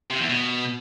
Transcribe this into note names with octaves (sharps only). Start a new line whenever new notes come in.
C3
E2
B2